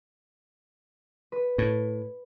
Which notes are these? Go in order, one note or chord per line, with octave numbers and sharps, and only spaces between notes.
B4
A2